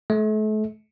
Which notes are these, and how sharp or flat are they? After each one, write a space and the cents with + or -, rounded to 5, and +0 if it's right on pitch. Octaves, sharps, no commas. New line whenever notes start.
A3 -40